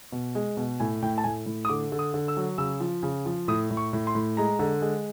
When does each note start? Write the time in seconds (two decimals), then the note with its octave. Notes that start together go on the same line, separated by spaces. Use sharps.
0.12 B2
0.35 G#3
0.57 B2
0.80 A2 G#5
1.02 A2 G5
1.18 A5
1.24 A2 G#5
1.46 A2
1.65 D#6
1.68 D3 D6
1.92 D3
1.99 D#6
2.14 D3
2.28 E6
2.37 F#3
2.58 C#3 E6
2.80 F3
3.03 C#3
3.26 F3
3.48 A2 D#6
3.70 A2
3.77 C#6
3.93 A2
4.07 C6
4.15 A2
4.37 G#3 A#5
4.59 D3
4.82 G#3